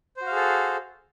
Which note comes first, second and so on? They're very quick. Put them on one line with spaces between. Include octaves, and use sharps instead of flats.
C5 F#4 F5 G#4 A4